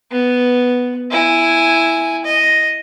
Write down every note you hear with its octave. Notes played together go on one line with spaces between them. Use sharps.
B3
E4 G#5
D#5